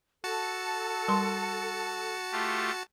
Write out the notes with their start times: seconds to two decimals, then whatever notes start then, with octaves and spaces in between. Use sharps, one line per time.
0.24 F#4 A4 A5 C#7
1.08 G3 A#4 C6
2.32 A3 F4 G4